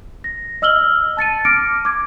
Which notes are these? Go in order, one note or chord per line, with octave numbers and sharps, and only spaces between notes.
A#6
D#5 E6 F6 F#7 G7
A5 A6 C#7 D#7
D6 F6 A#6 C#7 D7
D6 G#6